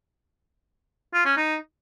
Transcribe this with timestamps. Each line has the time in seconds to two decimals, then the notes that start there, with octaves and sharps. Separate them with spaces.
1.14 F4
1.25 C#4
1.37 D#4